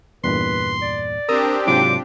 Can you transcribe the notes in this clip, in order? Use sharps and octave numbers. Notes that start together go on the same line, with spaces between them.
E2 G2 A#2 B4 C6
D5
C4 D4 G4 A#4 D#6 E6
G#2 C3 F#3 F4 D6